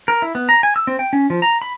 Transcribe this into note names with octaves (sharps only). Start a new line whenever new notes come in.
A#4
E4
B3
A#5
G#5
E6
C4
G5
C#4
F3
A#5
B5